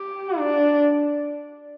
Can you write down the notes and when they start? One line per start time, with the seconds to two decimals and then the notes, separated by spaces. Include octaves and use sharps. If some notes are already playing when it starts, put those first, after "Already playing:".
Already playing: G4
0.38 D4